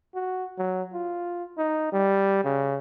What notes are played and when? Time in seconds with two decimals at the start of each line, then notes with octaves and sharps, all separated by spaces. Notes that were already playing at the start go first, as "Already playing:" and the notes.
0.15 F#4
0.58 F#3
0.94 F4
1.58 D#4
1.92 G3
2.44 C#3